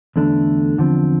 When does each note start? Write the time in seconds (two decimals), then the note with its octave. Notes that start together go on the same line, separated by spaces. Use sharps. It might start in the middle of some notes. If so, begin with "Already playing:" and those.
0.16 E2 D3 A3 D4
0.78 E2 D3 F3 C4